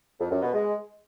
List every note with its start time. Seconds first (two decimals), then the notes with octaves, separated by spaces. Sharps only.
0.20 F2
0.31 F#2
0.42 B2
0.53 G#3